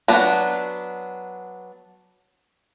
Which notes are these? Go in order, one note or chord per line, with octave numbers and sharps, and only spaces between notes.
F#3 B3 D4